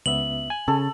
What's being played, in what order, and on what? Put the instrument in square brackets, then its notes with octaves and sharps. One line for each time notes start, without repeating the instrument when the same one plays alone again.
[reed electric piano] C#2 B3 E5 [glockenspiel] F#7
[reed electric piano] G#5
[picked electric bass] C#3 [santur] A4